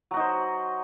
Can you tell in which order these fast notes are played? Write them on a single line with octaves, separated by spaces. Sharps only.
F#3 F#4 D#4 C5